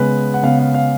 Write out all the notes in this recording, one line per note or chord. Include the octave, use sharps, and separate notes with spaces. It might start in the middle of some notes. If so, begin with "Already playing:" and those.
Already playing: C#3 G#3 B3 B4
F#5
C#3 G#3 B3 F5
F5
F5